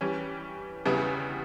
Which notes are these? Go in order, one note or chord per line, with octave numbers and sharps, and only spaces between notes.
E3 G3 C#4
E2 C#3 G3 B3 E4